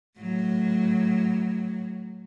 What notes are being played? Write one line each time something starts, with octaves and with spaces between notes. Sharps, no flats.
A2 F#3